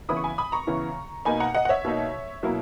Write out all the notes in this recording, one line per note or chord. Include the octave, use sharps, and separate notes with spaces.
C#3 E3 B3 E4 B5 D#6
C#6
G#5 B5
B5 D#6
A#5 C#6
C#3 E3 B3 E4
B2 A#3 D#4 G#5 B5
F#5 A#5
D#5 F#5
F#5
C#5 E5
B2 A#3 D#4
B2 F#3 A#3 E4